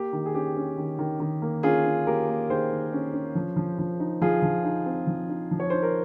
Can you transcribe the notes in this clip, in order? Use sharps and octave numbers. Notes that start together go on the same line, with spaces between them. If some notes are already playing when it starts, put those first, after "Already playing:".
Already playing: A#3 G4
D#3
G#4
C#4 G4
C#4
D#3
D#3
D#3
A#3
C#4 F4 G#4
C#4
A#3 G4 A#4
A#3
D#3 G#4 C5
D#3
C#4
C#4
F3
F3
F3
D#4
F3 F4 G#4
F3
D#4
C4
F3
D#4
F3
C#5
D#4 C5
A#4